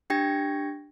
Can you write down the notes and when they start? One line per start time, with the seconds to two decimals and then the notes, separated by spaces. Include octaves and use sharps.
0.10 D4 G4 G5 G#6 A#6